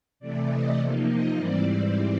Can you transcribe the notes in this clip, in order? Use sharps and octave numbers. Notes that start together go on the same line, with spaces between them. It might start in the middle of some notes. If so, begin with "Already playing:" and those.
C3 E3 A3 D5
D#5
C3 F3 A#3 D#4
D#5
G#2 E3 G3 C4 D5
D5